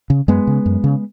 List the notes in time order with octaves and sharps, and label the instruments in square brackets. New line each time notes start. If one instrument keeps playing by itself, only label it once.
[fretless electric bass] C#3
F#2 G#3 B3
C#3
F#2
C#3